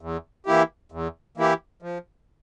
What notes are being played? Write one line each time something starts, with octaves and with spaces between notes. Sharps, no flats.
E2
E3 A#3 E4 G4
E2
E3 A#3 E4 G4
F3